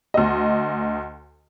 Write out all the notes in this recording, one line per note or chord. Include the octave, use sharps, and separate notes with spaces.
D2 D#5